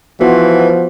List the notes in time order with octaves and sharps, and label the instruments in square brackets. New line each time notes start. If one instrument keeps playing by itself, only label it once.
[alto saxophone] E3 [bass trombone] F3 [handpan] B3 F#4 C5